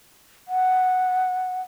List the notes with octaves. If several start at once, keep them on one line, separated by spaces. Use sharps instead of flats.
F#5